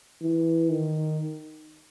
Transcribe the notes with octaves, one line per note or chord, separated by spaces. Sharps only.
E3
D#3